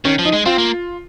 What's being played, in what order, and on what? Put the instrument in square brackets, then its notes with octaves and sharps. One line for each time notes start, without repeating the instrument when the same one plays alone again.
[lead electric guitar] D#3 [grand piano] C#4
[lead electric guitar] F3
[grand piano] D#4
[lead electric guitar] G#3
[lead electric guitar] C4 [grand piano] F4
[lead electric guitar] A#3